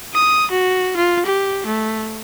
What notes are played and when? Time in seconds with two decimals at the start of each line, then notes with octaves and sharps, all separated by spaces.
0.14 D#6
0.51 F#4
0.96 F4
1.26 G4
1.66 A3